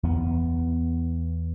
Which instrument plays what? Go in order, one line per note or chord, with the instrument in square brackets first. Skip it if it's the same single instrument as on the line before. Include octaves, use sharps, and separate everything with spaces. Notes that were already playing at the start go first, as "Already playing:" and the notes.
[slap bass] E2 B3